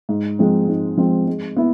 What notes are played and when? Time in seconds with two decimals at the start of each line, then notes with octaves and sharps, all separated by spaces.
0.09 G#2
0.39 F3 G#3 C4
0.68 G#2
0.97 F3 G#3 C4
1.27 G#3
1.57 B3 E4